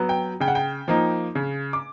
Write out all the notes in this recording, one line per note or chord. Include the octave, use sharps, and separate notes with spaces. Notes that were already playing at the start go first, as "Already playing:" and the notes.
Already playing: F#3 B3
G5
C#3 G5
F#5
G5
F3 A#3 D#4
C#3
D6